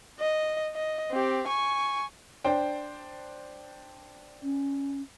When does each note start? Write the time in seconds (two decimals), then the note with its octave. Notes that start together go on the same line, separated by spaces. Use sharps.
0.20 D#5
0.75 D#5
1.12 C4 G4
1.47 G#5 C#6
2.44 D4 C5 G5
4.42 C#4